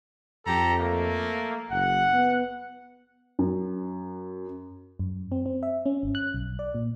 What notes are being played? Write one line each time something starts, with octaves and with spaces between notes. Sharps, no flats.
F2 G4 A4 A#5
A3 A#3
F#1 F#5
B3
F#2
F#2
C4
C4
E5
C#4
G1
F#6
B1
D5
A#2